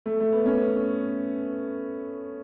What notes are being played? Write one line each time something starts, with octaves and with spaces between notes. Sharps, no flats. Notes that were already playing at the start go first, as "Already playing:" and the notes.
A3
A3
B3
C#4